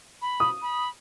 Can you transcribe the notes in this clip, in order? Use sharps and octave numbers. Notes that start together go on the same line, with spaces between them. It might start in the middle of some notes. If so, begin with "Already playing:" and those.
B5
D#6
B5